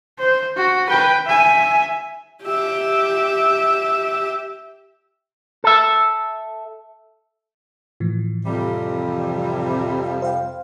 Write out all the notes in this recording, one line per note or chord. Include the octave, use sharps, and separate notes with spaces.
C5
F#4
B4 G5
E5 G#5
G4 E5
A4 E5
A2 E3 F3
F2 C3 G3
F5
C5 F5 G5